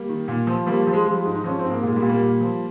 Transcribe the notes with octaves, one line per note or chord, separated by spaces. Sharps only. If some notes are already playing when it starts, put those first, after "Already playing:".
Already playing: G3 A#3
D#3
A#2
F3
F3 G3 A#3
G3
F3
G#3
F3 G#3
G3
G#3
G#2
D#4
F3 C#4
C4
G#2
A#3
A#2 G#3
G3 A#3
A#2
G3 A#3
A#2
F3